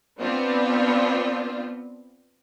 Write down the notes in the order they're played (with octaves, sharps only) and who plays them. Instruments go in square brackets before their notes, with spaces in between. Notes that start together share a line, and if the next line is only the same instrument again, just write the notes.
[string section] B3 C4 D4 F4